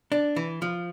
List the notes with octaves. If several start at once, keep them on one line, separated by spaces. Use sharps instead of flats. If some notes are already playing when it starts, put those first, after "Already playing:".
D4
E3
F3